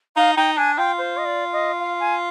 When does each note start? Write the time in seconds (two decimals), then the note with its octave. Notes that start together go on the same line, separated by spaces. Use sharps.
0.16 D#4 F5
0.37 D#4 G5
0.57 D4 G#5
0.77 F4 G5
0.98 C5
1.18 D#5
1.25 D5
1.53 D#5
1.79 F5
2.00 G#5